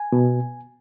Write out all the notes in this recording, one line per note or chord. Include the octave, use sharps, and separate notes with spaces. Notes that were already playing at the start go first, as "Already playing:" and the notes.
Already playing: G#5
B2